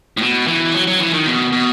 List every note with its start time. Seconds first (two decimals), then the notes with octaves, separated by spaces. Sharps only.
0.17 A2
0.21 B2
0.48 E3
0.74 F#3
0.87 F#3
1.00 E3
1.14 D#3
1.26 B2
1.52 B2